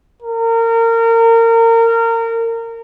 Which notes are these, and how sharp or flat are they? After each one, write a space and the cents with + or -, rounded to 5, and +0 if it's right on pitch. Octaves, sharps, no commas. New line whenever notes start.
A#4 -25